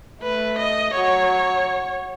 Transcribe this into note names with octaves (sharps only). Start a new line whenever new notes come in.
A3 B4
D#5
F#3 C#5